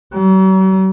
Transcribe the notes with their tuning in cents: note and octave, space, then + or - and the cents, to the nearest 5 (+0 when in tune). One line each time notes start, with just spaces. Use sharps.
F#3 +45